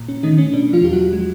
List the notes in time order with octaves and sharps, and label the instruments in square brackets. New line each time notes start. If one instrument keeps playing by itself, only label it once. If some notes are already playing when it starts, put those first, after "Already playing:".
Already playing: [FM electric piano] A#2
C#4
D#3 A3 D#4
C#4
B2 D4
F3 F4
E2 G4
F#3 F#4
G#3